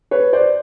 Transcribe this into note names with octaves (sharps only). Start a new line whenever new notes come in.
B4 C#5
C5 D5